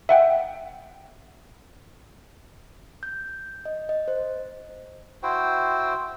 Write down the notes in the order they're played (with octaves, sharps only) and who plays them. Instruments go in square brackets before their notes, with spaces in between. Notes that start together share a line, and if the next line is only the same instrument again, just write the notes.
[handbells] E5 F#5 G5
[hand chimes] G6
D#5
D#5
C5
[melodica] E4 F#4 C5 G5